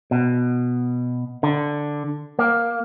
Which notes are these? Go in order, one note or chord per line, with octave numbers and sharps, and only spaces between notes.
B2
D3
A#3